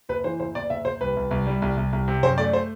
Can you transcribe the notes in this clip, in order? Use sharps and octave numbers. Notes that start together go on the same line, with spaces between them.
F#1 B4
E3 C5
F#1 C5
F#1 D5
F#1 E5
F#1 C5
C2 B4
C2
C2
G3
C2
C2
C2
C3
F#2 C5
A3 D5
C5